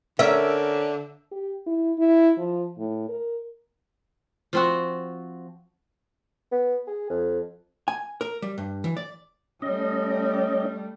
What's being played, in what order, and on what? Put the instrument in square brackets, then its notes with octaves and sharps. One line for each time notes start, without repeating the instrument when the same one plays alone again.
[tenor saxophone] D3 [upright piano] C#4 A#4 [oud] E5
[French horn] G4
E4
E4
F3
A2
A#4
[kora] F3 C4 F#4
[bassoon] B3
G#4
F2
[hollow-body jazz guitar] G#5
A#4
G3
G2
E3
D5
[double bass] G3 A3 [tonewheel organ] C#4 D#5